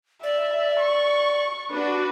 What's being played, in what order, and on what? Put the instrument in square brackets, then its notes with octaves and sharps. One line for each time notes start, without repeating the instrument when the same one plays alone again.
[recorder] D5 [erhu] E5
[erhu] C#6
[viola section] D4 F#4 [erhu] B4